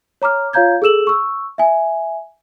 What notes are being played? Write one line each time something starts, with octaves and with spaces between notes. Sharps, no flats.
C#5 A#5 D6 F6
F4 C#5 F5 A#5 G6 G#6
G#4 A4 E6 E7 F#7
C#6 E6
E5 G#5